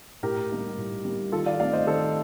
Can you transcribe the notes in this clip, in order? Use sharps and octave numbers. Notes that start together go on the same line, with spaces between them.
A2 G4 A#4
G3 A#3 D#4
A2
G3 A#3 D#4
D#3 F4 A4
D5 F5
A3 C4 D#4 D5 F5
C5 D#5
D#3 A4 C5